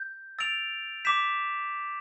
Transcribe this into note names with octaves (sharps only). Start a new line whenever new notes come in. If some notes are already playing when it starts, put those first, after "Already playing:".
Already playing: G6
E6 A6 D7 F7
D6 G6 B6 E7